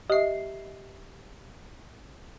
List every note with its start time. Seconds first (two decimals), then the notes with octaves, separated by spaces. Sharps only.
0.10 G4 D#5 E5 C7